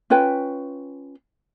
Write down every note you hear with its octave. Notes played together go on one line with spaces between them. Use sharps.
C#4 F4 B4 G5